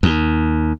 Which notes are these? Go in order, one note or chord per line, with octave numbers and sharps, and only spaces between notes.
D#2